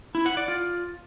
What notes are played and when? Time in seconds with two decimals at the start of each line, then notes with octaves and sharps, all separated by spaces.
0.15 E4
0.26 F#5
0.37 D5
0.48 F4